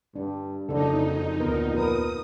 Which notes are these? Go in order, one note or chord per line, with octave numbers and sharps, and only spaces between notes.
G2 D4
F#1 F2 C#3 D4 D#4 A4
D2 A#2 B3 A#4
A#4 B4 D#6